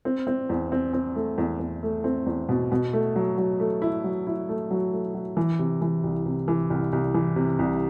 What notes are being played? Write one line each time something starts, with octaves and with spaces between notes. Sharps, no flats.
C4
C4
E2
C4
C4
A3
E2
E2
A3
C4
E2
B2
B2
A3
F#3
F#3
A3
E4
F#3
E4
A3
F#3
A3
F#3
E3
C3
E3
C2
C3
E3
C2
C2
E3
C3
C2